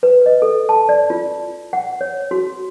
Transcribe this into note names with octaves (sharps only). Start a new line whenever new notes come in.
B4
D#5
A4
A5
D5
F4
F#5
C#5
F#4